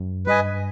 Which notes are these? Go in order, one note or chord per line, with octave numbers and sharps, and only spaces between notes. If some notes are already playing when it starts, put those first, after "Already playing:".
Already playing: F#2
G2 B4 D#5 G#5